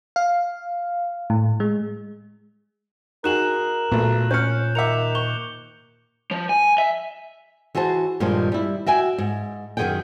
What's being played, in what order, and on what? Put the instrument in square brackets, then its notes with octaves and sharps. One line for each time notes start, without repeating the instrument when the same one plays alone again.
[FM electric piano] F5
A2
G#3
[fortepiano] D#4 F#4 G#4 [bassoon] A#4 [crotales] F#6 E7 F#7
[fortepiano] B1 A3 [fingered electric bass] A#2
[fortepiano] C#4 F6 [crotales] G6 C#7
[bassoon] D#3 [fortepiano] E5 A#5 [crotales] D6 C#7 F7
[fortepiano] C#6 [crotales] G7
[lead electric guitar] F3
G#5
E5
[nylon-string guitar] E3 F#4 G#4 C5 A5
G2 A#2 D#3 F3 G#3
G3 E4
F#4 E5 G5 G#5
G#2
F#2 D#3 F3 G#4 F#5 G5